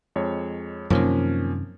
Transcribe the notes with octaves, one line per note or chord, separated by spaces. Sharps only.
F2 G#3 C#5
F#2 C3 D#3 F3 A#3 C#4